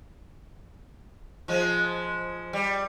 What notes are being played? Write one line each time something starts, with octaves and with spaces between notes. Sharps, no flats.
F3 G#3
G3